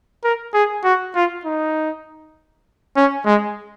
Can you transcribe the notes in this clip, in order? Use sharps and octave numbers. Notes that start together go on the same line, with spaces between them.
A#4
G#4
F#4
F4
D#4
C#4
G#3